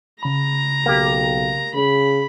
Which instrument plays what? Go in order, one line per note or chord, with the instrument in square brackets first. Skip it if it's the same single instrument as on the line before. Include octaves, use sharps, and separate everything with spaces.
[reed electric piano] C#3 B5 [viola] A#5
[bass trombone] B1 [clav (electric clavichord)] A#3 G4
[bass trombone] C#3 [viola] B5